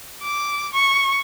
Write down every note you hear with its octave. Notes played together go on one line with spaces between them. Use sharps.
D6
C#6